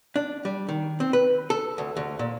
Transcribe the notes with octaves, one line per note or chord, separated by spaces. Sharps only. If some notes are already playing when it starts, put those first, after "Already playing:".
D4
G3
D#3
C4
B4
A4
D2
D2
A#2